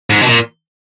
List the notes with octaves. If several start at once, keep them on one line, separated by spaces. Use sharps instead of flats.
G#2
B2
A#2